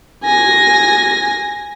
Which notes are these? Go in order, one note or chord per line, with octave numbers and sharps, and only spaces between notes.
G#5 A#6